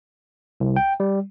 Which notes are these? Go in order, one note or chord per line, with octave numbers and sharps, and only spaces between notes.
C2
G5
G3